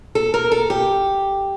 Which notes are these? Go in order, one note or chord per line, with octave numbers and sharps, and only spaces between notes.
A4
A#4
A4
G4